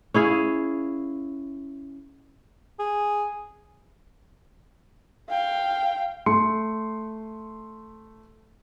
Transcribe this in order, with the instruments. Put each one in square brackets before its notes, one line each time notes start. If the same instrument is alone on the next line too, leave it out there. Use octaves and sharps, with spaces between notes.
[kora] C#4 E4 G#4 F5
[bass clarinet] G#4
[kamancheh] F5 G5
[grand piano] A3 C6 C#7